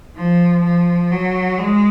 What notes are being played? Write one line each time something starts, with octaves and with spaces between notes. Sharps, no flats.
F3
F3
F#3
G#3